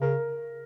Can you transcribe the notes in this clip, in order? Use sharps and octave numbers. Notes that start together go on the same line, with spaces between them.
C#3 A#4